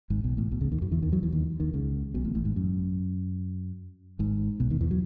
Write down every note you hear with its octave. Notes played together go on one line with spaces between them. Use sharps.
G#1 G#2
B1 B2
A1 A2
B1 B2
C#2 C#3
D#2 D#3
F#2 F#3
E2 E3
D#2 D#3
F#2 F#3
E2 E3
D#2 D#3
D#2 D#3
C#2 C#3
B1 B2
A1 A2
A1 A2
G#1 G#2
F#2
G#1 G#2
B1 B2
D#2 D#3
E2 E3
F#3